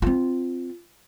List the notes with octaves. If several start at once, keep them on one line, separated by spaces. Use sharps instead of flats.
C4 F4